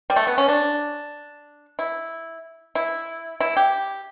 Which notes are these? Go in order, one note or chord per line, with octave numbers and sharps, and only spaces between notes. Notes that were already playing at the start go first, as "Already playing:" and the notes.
G3
A3
B3
C#4
D4
E4
E4
E4
G4